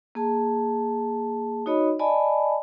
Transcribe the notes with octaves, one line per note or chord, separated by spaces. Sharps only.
A#3 G#4 A5
D#4 F#4 C#5 D#5 B5
D5 D#5 G#5 A5 B5